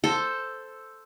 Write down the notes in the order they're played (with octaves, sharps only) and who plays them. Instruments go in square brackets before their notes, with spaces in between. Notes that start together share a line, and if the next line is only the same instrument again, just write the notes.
[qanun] A4 C5